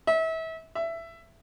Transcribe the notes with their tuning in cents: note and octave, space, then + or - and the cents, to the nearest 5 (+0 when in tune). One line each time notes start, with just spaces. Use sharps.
E5 -30
E5 +15